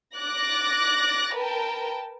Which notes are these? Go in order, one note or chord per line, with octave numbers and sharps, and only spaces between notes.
D6 F#6 A6 A#6
A#4 B4 G5 A5